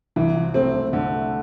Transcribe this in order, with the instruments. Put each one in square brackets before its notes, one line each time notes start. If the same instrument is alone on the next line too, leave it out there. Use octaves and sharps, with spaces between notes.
[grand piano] C2 [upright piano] E3
[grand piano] F3
[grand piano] A3 [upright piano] C4
[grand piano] C2
[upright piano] D3 [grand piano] A3
[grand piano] A3